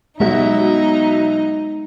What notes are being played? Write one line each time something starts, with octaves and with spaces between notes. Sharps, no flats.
B2 F#3 G#3 D#4 E5